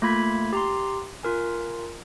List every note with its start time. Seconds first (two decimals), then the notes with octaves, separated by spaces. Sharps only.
0.02 A3 A#3 F4 B5 G#6 B6
0.53 G4 A#5 C6
1.23 F4 A#4 G#5